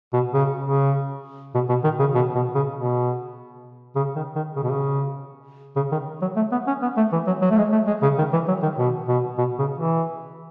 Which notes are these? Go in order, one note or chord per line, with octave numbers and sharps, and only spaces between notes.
B2
C#3
C#3
B2
B2
D#3
C#3
B2
B2
C#3
B2
C#3
D#3
D#3
C#3
B2
C#3
C#3
D#3
F#3
A3
B3
C#4
B3
A3
E3
F#3
F#3
A3
G#3
A3
G#3
C#3
D#3
E3
F#3
D#3
B2
B2
B2
C#3
E3